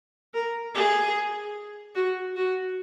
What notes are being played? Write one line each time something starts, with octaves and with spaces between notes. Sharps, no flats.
A#4
G#4
F#4
F#4